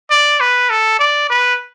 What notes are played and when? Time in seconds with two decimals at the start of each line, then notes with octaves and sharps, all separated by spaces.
0.10 D5
0.40 B4
0.70 A4
0.99 D5
1.30 B4